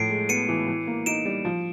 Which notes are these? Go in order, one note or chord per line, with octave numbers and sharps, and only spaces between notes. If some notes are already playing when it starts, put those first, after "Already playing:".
Already playing: A2 F3 C7 D7
G#3
B3 C#7 D#7
E3
E3
A#3
D#4 D7 E7
G3
F3